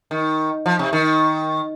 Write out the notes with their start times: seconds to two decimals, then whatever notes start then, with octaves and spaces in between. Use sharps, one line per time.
0.11 D#3
0.66 F3
0.79 C3
0.93 D#3